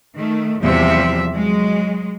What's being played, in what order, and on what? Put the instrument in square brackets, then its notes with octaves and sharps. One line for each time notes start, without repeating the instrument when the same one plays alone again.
[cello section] D#3 A3
E2 C3 F3 G3 E5
F#3 G#3